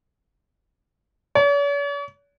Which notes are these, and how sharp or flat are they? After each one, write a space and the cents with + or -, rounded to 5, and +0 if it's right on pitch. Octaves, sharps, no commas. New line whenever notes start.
C#5 +45